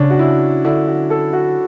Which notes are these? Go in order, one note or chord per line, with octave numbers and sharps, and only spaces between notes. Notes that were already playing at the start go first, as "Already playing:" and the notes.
Already playing: C#3 C#4 D4
F#4
E4
D3 E4
F#4
A4
F#4